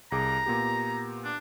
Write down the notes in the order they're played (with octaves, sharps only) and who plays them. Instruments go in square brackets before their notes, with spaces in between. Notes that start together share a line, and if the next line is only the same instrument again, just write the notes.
[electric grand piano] C2 G#4 D6 [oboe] A#5
[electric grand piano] A#2 B3 G4
[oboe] D4